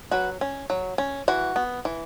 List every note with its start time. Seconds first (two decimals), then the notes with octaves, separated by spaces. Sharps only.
0.11 F#3 F#4 B4
0.41 C#4
0.70 F#3
0.98 C#4
1.28 E3 F#4
1.56 B3
1.85 E3